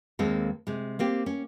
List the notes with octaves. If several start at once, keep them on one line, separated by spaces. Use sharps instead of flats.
D#2 G#3 A#3 C4 A4
C3 G#3
A#3 C4 G4
C#4